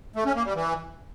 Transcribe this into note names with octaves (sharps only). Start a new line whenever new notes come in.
A3
C#4
A#3
G3
E3